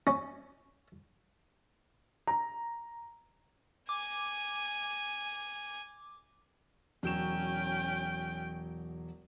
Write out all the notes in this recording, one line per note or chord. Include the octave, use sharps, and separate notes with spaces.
C#4
A#5
G#5 D6
E1 F#3 C#4 G5 E7